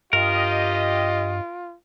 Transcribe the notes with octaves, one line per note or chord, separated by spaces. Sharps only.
G2 F4 G4 A#4 D#5